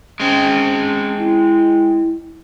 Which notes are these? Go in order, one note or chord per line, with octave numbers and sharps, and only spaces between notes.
G#3 C4 C#4
E4